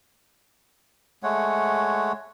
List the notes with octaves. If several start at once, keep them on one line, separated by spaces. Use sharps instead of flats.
G#3 A3 C#5 F#5